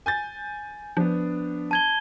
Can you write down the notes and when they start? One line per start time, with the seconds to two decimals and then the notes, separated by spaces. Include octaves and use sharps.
0.06 G#5 G6 A6
0.97 F3 B3 D4
1.71 A5 G#6 G7